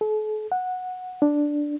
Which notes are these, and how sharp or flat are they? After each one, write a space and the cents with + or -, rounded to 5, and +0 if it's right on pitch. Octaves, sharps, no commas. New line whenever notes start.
A4 -45
F#5 -10
D4 +0